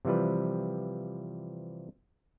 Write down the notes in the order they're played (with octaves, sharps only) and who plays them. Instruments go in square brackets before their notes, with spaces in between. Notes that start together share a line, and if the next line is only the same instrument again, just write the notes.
[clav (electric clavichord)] C3 E3 F3 G3 B4